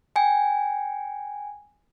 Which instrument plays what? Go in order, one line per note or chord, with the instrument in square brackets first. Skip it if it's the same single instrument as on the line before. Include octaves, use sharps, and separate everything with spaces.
[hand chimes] G5 G#5